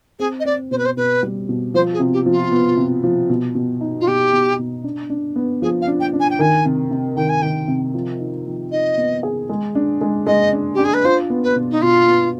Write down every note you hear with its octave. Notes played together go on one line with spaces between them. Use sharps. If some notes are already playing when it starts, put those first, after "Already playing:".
C4 G#4
D#5
C4 D5
B2 C5
B4
C5
B2 B4
G3
B2
F3 C5
G#4
C3
G4
F3
F4
B3
C3
F3
B2
B2
D#4
F4
B2 G4
B2
B2
D4
D4
B3
F3 G#4
F5
D4
G5
D4
G#5
G5
D#3 G#5
C3
C3
D#3 G5
G#5
D#3 G5
C3
F3
D#4
F3
D#4 D#5
B3
G#4
G#3
D4
G#3
G#3 D#5
D4
D4 G4
G#4
B4
F4 C5
B3
B4
B2
D#4
B2 F4
B3